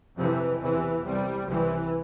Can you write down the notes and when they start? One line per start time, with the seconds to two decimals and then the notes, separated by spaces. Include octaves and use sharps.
0.17 F2 C3 E3
0.61 E2 C3 E3
1.04 C2 C3 G3
1.48 C2 C3 E3